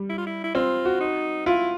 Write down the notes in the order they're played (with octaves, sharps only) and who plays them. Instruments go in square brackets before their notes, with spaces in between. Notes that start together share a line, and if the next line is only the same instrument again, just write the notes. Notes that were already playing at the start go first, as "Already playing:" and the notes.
Already playing: [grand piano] G3
[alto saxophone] E4
F4
E4
E4
[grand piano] C4 [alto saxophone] F4
[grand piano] F#4
[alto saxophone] D#4
[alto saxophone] E4 [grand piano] F4